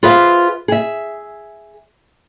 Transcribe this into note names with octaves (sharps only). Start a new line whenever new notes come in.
F4 G#4 B4 C5 E5 F5
G#4 E5